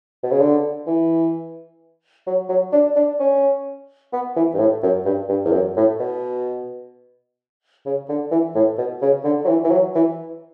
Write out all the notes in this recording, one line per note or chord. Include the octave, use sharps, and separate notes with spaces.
B2
C#3
D3
E3
F#3
F#3
D4
D4
C#4
B3
E3
G2
A2
F#2
G2
G2
E2
F#2
A2
B2
C#3
D3
E3
A2
B2
C#3
D3
F#3
E3
E3
F#3
E3